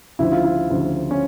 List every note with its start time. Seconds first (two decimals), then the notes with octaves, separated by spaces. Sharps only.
0.19 D2 C#3 F3 E4
0.32 F4
0.44 E4
0.70 D2 C#3 F3
1.11 C#4